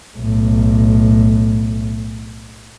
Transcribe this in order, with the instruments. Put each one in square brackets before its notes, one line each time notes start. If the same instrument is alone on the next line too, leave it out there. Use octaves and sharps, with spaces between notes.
[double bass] B1 A2